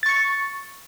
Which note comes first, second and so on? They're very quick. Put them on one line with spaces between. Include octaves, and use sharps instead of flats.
A6 C#6 C#7